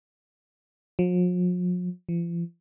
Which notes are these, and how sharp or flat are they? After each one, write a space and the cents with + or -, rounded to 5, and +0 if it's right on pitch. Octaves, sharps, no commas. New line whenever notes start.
F3 +45
F3 -40